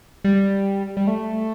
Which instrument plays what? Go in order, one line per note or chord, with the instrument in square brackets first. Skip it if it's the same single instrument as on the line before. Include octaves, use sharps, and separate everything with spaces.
[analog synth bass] G3
G3
A3